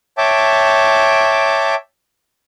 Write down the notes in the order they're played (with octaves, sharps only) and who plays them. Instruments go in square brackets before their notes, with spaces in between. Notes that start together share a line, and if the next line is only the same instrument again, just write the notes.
[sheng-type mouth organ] C#5 E5 G5 A5 D6